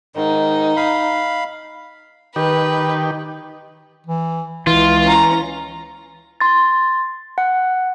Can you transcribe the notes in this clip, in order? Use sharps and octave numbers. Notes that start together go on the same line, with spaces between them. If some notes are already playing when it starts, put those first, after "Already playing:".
G#2 D#3 D#4
F5 B5
D#3 G4 B4
E3
C#2 E3 F4
C#4 A#5
C6 A6
F#5